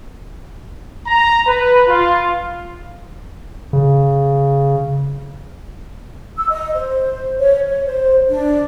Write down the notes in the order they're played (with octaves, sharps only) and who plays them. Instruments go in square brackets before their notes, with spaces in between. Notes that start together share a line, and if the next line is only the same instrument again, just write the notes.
[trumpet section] A#5
B4
F4
[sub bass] C#3
[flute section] E6
D#5
C5
C#5
C#5
C5
D4